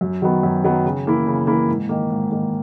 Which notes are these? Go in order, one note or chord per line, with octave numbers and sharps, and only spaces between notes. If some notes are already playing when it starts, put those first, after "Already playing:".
F#2
D#3 F#3 B3
F#2
D#3 F#3 B3
C#3
E3 A#3 E4
C#3
E3 A#3 E4
G#2
D#3 A#3
G#2
D#3 A#3